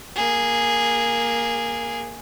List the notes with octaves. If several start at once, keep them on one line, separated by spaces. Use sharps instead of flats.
A#3 G#4